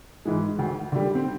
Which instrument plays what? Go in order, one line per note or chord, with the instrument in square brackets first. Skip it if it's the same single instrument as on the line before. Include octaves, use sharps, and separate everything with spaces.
[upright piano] G#2 E3 G#3
D2
D3 G3
C4